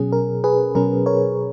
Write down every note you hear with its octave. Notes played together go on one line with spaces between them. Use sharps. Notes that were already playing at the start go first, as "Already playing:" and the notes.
Already playing: B2 F#3 C#4 G#4
A#4
G#4 B4
B2 F#3 C#4 A#4
A#4 C#5